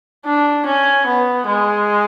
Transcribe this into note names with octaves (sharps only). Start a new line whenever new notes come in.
D4
C#4
B3
G#3